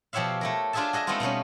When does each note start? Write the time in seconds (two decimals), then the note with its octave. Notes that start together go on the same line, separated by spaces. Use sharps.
0.13 B2 F3 G4 C#5 E5 F5
0.41 A3 E4 A#4
0.73 D4 F4 G4 G#4 E5 A5
0.93 F#4 G#4 D#5 E5
1.07 G#3 A3 B3 C4 D#4 F4
1.20 B2 G3 B3 C#4